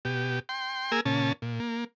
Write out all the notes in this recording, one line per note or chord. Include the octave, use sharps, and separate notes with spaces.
B2 G4
G5 C6
A#3 G#4 A#4 G#5 E6
A#2 C#3 C#4 A5
A#2
A#3